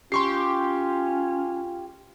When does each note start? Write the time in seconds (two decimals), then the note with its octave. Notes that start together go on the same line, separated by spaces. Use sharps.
0.12 C#4 F4 G4 C6 C#6 C7